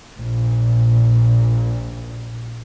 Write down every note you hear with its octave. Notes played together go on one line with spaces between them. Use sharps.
A#1 A#2